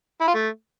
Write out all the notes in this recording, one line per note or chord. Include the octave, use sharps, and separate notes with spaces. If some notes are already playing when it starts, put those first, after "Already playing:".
E4
F4
A3